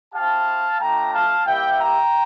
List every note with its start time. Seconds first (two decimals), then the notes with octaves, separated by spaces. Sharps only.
0.13 C4 E4 G4 F5 A5
0.80 A3 D4 F4 G5 A#5
1.13 F5 A5
1.46 G3 A#3 E4 G4 E5 G5
1.80 G5 A#5